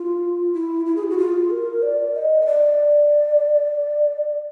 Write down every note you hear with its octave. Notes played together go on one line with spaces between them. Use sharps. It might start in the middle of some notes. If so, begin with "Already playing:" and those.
Already playing: F4
E4
E4
G#4
G4
F#4
F4
A#4
D5
D#5
D#5
D5